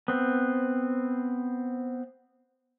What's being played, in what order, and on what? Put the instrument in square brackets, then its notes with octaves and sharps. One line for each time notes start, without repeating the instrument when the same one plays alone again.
[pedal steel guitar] B3 C4